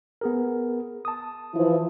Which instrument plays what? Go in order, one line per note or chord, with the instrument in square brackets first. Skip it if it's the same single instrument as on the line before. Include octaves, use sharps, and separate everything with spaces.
[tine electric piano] B3 G#4 A#4
A5 D#6
[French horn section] E3 F3 E4